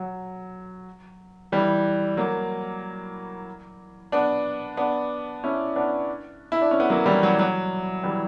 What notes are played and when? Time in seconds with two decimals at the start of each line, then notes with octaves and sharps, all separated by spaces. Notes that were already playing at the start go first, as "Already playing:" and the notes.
Already playing: F#3
1.52 E3 G3
2.17 F#3 A#3
4.12 B3 D4
4.77 B3 D4
5.44 C#4 E4
5.76 B3 D4
6.52 E4
6.61 D4
6.71 C#4
6.80 B3
6.90 F#3 A#3
7.06 E3 G3
7.23 F#3
7.39 F#3
8.04 E3 G3